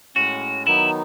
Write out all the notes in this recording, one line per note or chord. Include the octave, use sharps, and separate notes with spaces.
A2 G#3 C#4 F#4
D#3 F#3 B3 D#4 E4